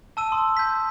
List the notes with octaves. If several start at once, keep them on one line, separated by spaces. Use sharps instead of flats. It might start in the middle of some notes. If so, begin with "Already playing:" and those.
A5 E6 D#7
C6 D#6
G6 B6